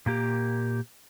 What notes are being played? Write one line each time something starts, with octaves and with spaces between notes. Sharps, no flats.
A#2 A#3 G4